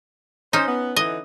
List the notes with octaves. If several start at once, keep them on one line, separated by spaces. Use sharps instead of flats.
C#4 D#4 C5
B3
D3 E3 D#4 D#5